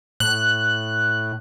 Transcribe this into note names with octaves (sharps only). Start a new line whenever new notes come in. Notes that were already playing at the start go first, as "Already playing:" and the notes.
A2 F#6